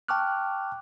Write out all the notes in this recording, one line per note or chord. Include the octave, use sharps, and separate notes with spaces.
G5 A5 C#6 D6 F6 F#6